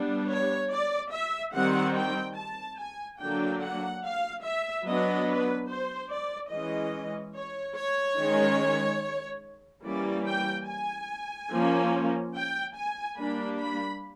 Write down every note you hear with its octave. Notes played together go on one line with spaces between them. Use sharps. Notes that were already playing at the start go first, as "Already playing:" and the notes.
Already playing: G3 B3 D4
C#5
D5
E5
D#3 G3 C4 F#5
G5
A5
G#5
D3 F#3 A#3 D4 G5
F#5
F5
E5
F#3 B3 D4 D#5
B4
C5
D5
E3 G#3 C#4 D#5
C#5
C#5
D#3 G#3 C#4
E3 G3 A#3 C#4 D5
G5
G#5
F3 A#3 C#4
G5
G#5
G3 A#3 D4 B5
B5